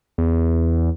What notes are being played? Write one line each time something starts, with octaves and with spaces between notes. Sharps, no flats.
E2